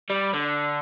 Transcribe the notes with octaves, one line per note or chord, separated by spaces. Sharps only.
G3
D3